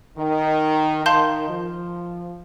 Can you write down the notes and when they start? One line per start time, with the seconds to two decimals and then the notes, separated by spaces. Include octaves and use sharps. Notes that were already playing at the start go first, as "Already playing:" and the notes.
0.17 D#3
1.05 D#3 F5 A5 C6 G6
1.49 F3